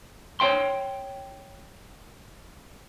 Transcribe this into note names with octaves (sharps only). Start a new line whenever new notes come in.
C#5 F5 G5 C6